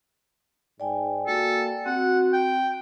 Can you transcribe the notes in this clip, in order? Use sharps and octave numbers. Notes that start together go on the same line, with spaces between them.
G#2 D5 G5 G#5
A#3 F#4 A4
C4 F#4 F#5
G5